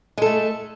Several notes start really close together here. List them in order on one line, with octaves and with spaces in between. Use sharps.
G#3 A4 A3